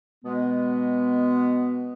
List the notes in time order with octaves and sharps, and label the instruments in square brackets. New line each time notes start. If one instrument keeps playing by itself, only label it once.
[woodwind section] B2 G#3 B3